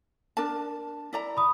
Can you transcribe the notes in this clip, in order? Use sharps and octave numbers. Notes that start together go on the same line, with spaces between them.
D4 A#4 A5
E4 D5 A#5
B5 D#6